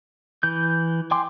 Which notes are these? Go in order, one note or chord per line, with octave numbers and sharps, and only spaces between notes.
E3 G6
G5 G#5 C6 D6